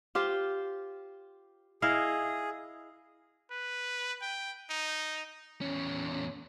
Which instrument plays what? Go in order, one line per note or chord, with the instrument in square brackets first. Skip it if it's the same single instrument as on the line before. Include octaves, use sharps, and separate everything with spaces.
[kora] F4 G4 C5
[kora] E4 D#5 F5 [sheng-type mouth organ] G#4
[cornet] B4
G5
D#4
[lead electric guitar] E2 C#4